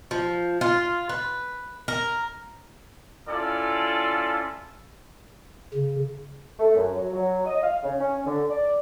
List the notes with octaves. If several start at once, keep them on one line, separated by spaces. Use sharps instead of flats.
F3
F4
B4
A#4
C#4 E4 F4 A4 D5
C#3
A3
F#2
F#3
F#3
D#5
F5
C#3
C#4
D3
D5